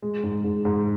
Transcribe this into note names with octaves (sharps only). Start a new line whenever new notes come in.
G#3
G#2
G#2
G#2